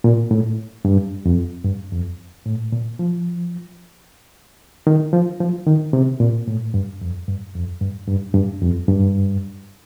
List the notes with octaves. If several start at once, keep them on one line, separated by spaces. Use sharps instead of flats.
A#2
A2
G2
F2
G2
F2
A2
A#2
F3
D#3
F3
F3
D#3
C3
A#2
A2
G2
F2
G2
F2
G2
G2
G2
F2
G2